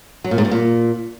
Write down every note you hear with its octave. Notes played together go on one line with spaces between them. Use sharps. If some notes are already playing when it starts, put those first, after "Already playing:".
F#3
A#2
G#2
G2
A#2